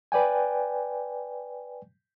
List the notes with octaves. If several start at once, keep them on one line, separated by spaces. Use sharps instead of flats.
B4 D5 G5 G#5